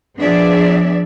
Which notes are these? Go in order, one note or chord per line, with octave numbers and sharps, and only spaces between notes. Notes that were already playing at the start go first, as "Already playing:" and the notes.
F3 B3 D4 G#4 D5 E5